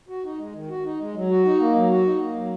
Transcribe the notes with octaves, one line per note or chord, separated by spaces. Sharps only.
F#4
D#4
G#3
D#3
F#4
D#4
G#3
F#3
F#4
D#4
A#3
F#3
F#4
D#4
A#3
F#3